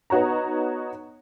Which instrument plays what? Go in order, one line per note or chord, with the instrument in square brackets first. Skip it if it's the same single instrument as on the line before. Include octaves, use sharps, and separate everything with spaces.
[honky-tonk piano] B3 D#4 F#4 C#5 A#5